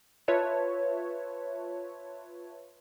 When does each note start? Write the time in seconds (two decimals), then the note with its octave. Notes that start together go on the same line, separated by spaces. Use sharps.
0.28 F4 B4 C#5 E5 A5